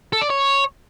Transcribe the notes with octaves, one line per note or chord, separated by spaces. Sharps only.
A4
D5
C#5